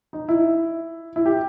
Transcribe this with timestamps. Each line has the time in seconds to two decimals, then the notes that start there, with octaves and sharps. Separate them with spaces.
0.13 D#4
0.29 E4
1.16 E4
1.26 G4